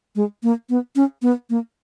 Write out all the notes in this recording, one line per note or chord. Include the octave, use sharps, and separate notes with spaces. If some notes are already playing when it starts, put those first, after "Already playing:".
G#3
A#3
B3
C#4
B3
A#3